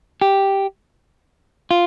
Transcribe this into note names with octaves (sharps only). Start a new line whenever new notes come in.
G4
F4